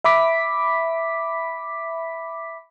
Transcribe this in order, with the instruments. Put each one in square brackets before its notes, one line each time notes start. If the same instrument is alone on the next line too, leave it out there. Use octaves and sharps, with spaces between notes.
[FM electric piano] E5 B5 D6 B6